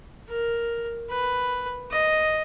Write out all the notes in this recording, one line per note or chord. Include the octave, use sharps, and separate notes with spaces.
A#4
B4
D#5